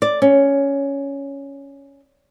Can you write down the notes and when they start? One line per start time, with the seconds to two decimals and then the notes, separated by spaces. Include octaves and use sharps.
0.02 D5
0.22 C#4